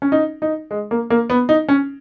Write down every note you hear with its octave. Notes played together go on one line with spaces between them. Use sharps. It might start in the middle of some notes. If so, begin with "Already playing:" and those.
C#4
D#4
D#4
G#3
A#3
A#3
B3
D#4
C#4